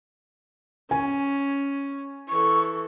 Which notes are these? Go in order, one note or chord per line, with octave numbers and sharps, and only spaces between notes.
C#4 G#5
E3 A4 C#6